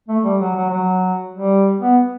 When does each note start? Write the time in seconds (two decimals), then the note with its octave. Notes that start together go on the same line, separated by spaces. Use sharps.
0.08 A3
0.24 G3
0.40 F#3
0.56 F#3
0.70 F#3
1.34 G3
1.80 B3